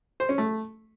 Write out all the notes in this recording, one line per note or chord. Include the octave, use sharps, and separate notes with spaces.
C5
C#4
A3